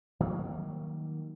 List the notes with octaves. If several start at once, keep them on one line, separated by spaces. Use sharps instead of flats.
D#3 F#3 G3 A#3